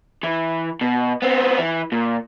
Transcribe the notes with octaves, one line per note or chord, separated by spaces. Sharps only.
E3
B2
B3 C4
E3
A#2